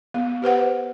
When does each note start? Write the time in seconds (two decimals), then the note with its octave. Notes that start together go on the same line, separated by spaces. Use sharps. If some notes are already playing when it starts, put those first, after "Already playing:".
0.14 B3
0.42 G4 B4 C5 F#5